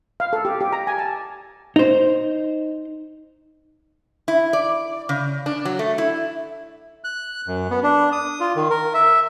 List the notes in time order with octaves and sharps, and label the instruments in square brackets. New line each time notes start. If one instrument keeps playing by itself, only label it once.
[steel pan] F5
A4
G4
G4
A#5
G#5
A5
[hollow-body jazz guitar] D#4 C5
[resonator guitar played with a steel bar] E4
D5
C#3
D4
F#3
A3
E4
[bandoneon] F#6
F#2
B3
D4
D#6
F4
D#3
A#4
E5